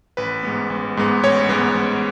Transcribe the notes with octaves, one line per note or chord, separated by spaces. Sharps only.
A1 B4
G#2 G#3 B3
A1
G#2 G#3 B3
A1 C#5
G#2 G#3 B3
A1